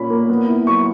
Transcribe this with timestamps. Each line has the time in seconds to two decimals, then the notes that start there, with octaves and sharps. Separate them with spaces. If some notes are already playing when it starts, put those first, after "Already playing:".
Already playing: A#2 A#3 C#4 B5
0.10 A#3
0.29 B3
0.48 E4
0.67 F#3 C#6